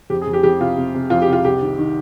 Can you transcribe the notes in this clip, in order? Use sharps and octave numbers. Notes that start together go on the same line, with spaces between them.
F2 G4
G#4
F2
G4
F2 G4
C3 F4
C3
C3
F2 F4
G4
C3
F4
C2 G4
D#3
D#3